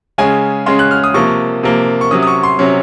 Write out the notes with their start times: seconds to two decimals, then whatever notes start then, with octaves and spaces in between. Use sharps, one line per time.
0.18 C#3 G#3 C#4 G#5
0.66 C#3 G#3 C#4 C6
0.79 F#6
0.91 F6
1.04 D#6
1.14 C3 F3 A#3 C#6
1.63 C3 F3 A#3
2.01 C#6
2.11 C3 F#3 C#4 D#6
2.23 D#6
2.27 C#6
2.43 C6
2.59 C3 F#3 C#4